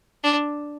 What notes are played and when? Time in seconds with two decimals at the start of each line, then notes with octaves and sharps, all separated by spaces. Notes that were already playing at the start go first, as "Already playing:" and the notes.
0.24 D4